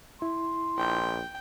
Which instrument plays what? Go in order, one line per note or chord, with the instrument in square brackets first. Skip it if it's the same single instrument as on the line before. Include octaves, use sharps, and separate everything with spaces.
[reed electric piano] E4 [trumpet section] C6
[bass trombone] A#1 [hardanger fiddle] G5